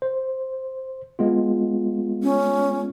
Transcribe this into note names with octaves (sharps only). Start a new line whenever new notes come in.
C5
G#3 B3 F4
C#4